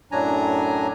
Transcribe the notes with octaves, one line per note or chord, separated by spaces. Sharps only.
F#2 A2 F#3 D4 G#5 A#5